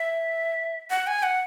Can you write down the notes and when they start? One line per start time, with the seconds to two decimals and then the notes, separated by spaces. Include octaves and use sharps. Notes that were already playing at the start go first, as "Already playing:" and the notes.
Already playing: E5
0.90 F#5
1.07 G#5
1.23 F#5